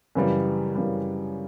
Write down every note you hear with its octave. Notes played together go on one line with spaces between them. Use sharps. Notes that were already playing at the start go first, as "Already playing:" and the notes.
F#2 C#3 E3 G3
F#2 C#3 E3 G3